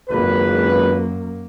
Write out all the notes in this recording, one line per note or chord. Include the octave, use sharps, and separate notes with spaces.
G#1 C#2 F#2 A#3 B4